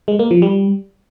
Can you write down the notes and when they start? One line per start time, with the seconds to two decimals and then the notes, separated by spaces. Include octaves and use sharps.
0.08 G#3
0.19 A#3
0.31 F3
0.42 G3